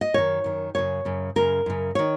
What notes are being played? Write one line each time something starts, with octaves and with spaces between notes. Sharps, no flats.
D#5
F#2 D#3 C#5
F#2 D#3
F#2 C#3 C#5
F#2 C#3
F#2 C#3 A#4
F#2 C#3
D#3 C#5